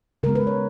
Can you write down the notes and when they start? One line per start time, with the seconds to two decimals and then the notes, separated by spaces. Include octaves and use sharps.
0.23 C#3 G#3 B3 A#4
0.35 B4
0.47 C#5